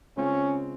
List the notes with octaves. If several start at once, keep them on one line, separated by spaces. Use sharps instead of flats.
C#3 G#3 C4 C#4 F4